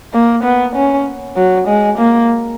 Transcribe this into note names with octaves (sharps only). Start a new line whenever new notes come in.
A#3
B3
C#4
F#3
G#3
A#3